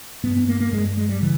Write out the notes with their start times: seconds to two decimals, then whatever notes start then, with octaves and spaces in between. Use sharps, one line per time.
0.23 G2 B3
0.37 B3
0.48 A#3
0.60 A#3
0.72 G2 G#3
0.97 G#3
1.09 G3
1.22 C#3 E3